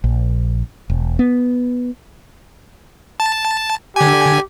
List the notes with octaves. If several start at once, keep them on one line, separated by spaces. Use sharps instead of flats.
A#1
E1
B3
A5
D3 G4 G#5